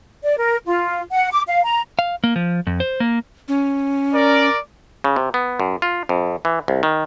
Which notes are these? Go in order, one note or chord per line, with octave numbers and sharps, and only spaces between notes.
D5
A#4
F4
F#5
D6
F5
A#5
F5
A#3
F3
F2
C5
A#3
C#4
A#4 D5
C#3
C3
B3
F#2
F4
F2
E3
C2
D#3